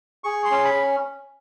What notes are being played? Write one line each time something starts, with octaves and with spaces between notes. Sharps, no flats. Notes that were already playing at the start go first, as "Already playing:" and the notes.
G#4 C#6
C6
C#4
B5